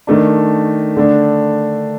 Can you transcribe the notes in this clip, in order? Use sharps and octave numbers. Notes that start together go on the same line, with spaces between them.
D#3 A3 D4
D3 A3 D4